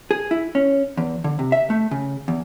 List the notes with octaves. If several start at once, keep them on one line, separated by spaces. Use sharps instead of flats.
G#4
E4
C#4
E2
D3
C3
E5
A3
C#3
E2